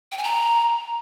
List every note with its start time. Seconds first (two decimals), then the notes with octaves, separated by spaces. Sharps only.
0.12 G5
0.18 G#5
0.24 A#5